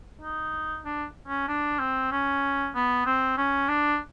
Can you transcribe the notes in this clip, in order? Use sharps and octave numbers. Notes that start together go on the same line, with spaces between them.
D#4
D4
C#4
D4
C4
C#4
B3
C4
C#4
D4